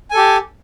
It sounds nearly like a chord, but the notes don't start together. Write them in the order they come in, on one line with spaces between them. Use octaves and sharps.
G#5 A4 G4